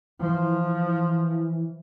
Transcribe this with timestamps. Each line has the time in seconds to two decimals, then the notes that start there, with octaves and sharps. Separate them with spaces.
0.20 E3 F3